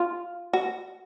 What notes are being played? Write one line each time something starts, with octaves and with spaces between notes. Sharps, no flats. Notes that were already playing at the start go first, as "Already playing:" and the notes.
Already playing: F4
F#4